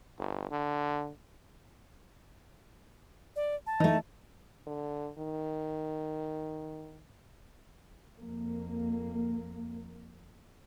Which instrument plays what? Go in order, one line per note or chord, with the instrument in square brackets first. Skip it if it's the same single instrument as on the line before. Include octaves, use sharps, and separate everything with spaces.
[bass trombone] G1
D3
[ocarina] D5
A5
[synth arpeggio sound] E3 [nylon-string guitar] A3 D#4
[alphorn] D3
D#3
[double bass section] F2 A#3